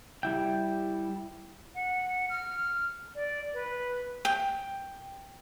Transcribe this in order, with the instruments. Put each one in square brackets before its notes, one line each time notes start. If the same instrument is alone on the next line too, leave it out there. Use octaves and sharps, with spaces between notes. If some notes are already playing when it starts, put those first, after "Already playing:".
[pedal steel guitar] G3 E4 G5
[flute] F#5
F6
D5
B4
[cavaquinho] G5